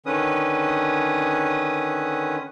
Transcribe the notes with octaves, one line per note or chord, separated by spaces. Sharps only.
D3 D#3 C#4 B4 D#6